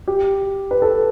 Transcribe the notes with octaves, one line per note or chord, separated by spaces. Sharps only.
G4
B4
A4